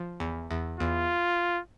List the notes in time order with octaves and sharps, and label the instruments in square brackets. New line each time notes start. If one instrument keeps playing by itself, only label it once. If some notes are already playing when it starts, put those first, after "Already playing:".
Already playing: [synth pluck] F3
E2
E2
[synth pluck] E2 [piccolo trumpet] F4